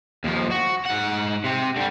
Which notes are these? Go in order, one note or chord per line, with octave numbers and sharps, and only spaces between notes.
D#2 F3
F#4
G#2 F#5
C3 C4
D3 G3